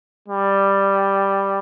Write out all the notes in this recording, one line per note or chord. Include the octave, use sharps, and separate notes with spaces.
G3